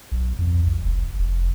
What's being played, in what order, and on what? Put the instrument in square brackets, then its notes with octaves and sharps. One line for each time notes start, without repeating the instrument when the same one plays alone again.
[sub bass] B1
F2
C2
F1
F1